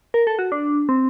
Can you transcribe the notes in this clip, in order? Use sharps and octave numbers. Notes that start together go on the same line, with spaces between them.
A#4
A4
F#4
D4
C4